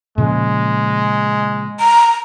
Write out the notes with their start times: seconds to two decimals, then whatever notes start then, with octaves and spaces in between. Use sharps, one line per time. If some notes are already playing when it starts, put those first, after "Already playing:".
0.18 A#2 C#3 F3 G#3
1.80 A#5